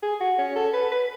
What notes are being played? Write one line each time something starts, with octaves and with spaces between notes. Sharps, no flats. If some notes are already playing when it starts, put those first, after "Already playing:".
G#4
F#4
C#4
A4
B4
B4